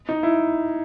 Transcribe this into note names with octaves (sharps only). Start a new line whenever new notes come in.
D#4
E4